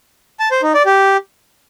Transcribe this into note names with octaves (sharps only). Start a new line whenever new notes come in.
A5
C5
D#4
D5
G4